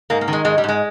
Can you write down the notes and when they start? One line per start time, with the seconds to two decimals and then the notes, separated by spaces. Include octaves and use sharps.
0.10 G#2 A#3
0.21 A#3
0.28 D#3
0.33 G#3
0.45 G#2 G#3
0.58 G3
0.64 G#2 G#3